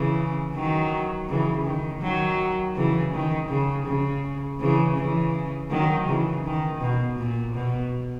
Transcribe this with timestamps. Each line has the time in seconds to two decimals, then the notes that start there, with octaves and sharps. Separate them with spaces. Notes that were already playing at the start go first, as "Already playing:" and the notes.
Already playing: C#3 E3
0.55 D#3 F#3
1.29 C#3 E3
1.65 D#3
2.02 D#3 F#3
2.76 C#3 E3
3.13 D#3
3.49 C#3
3.87 C#3
4.60 C#3 E3
4.97 C#3 E3
5.71 D#3 F#3
6.07 C#3 E3
6.44 D#3
6.81 B2
7.18 A#2
7.55 B2